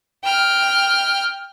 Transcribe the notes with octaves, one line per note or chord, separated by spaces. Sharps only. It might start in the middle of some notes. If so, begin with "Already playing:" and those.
G5 F6